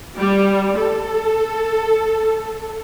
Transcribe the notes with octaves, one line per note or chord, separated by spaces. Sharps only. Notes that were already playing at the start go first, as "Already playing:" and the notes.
G3
A4